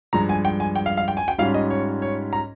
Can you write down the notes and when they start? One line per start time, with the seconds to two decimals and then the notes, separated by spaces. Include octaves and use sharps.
0.13 G2 F3 G#3 A#5
0.29 G#5
0.45 G5
0.60 G#5
0.75 G5
0.86 F5
0.97 F5
1.08 G5
1.17 G#5
1.28 G5
1.38 G#2 G3 C#4 F4 F5
1.54 D#5
1.70 C#5
2.02 C#5
2.33 A#5